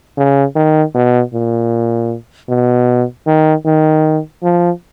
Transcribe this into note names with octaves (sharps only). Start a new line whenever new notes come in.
C#3
D#3
B2
A#2
B2
D#3
D#3
F3